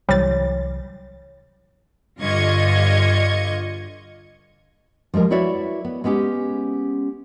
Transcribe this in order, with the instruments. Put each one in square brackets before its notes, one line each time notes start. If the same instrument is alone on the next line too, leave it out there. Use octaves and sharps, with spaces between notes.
[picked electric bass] C2 E3 F#3 [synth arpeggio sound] G3 A6 [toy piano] C#5
[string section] G2 D3 F4 D#5 C#6 G#6
[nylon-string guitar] F3 G3 G#3 A#4
E4 F#4 B4 C#5 D5 E5
B3
G#3 B3 C#4 G4 G#4